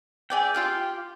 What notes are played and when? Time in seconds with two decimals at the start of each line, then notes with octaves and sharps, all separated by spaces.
0.30 G#4 D5 E5 G5
0.54 F4 G4 F5